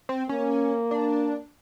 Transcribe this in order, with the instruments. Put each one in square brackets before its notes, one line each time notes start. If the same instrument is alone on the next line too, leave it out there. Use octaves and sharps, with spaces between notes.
[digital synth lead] C4
[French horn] A#3 [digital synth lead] C#4
[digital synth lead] D4